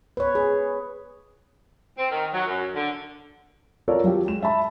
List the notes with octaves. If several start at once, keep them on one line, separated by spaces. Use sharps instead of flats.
B4 C#5
G#4
C4
D#3
F#3
F#2
D3
C4 F4 A4 A#4 C#5 D5
F#3 F4 G4
G#3 E7
E5 A5 B5